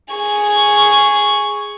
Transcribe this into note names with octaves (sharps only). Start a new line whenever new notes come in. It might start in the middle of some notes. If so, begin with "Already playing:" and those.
G#4 C#6